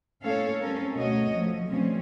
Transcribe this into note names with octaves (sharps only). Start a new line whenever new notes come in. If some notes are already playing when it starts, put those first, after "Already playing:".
A2 A#3 C#4 A4 C#5 F5
G3 C4 C#4 A4 A#4
D2 B2 A3 F#4 C#5 D#5
F3 A3
B2 F3 G3 A3 C4 C#4